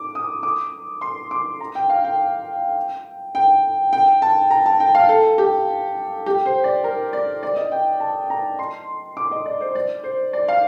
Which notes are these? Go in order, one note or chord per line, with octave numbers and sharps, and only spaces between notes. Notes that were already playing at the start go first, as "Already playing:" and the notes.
Already playing: D6
D#6
D6
C6
D6
A#5
G5
F5
G5
G5
G5
A5
A#5
A5
G5
F5
A4
G4
G4
C5
D5
A#4
D5
D5
D#5
G5
A5
A#5
C6
D6
D#5
D5
C5
D5
C5
D5
F5